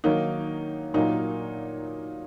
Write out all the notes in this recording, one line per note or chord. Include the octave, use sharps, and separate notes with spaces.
D#3 F#3 A#3 D#4
A#2 F#3 A#3 D#4